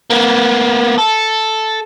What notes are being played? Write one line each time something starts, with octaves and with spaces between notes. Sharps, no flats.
A#3 B3
A4